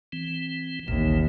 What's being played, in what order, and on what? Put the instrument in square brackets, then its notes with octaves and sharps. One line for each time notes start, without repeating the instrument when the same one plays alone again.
[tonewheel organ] E3 C4
[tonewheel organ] A1 A#2 E3 [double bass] D#2